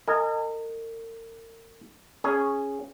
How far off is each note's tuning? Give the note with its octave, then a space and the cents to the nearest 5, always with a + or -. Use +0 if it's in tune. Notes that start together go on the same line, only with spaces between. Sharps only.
A#4 -40 D#5 -15 G#5 +0
C#4 +0 G#4 +0